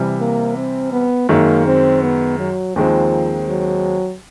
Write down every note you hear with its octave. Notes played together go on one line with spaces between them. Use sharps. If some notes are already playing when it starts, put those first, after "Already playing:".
Already playing: C3 E3 G3
A#3
C4
B3
F#2 D#3 G#3 A#3
C4
B3
F#3
D#2 D#3 F3 G#3 C4
F#3